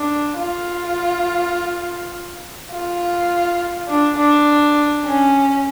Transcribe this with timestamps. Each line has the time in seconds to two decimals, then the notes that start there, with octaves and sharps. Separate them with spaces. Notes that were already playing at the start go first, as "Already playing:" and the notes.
Already playing: D4
0.37 F4
2.72 F4
3.88 D4
4.18 D4
5.05 C#4